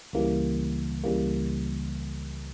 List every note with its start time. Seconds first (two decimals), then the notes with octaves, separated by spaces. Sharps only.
0.13 C#2 C#3 E3 G3 A#3
1.04 C#2 C#3 E3 G3 A#3